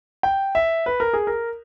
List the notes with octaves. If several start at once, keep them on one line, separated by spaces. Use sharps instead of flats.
G5
E5
B4
A#4
G#4
A#4